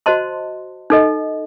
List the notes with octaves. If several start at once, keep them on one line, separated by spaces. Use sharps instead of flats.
F#4 C5 D#5 A5 C6
D#4 A4 D#5